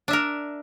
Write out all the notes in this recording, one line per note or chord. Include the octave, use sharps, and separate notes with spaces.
D4 A#4 E5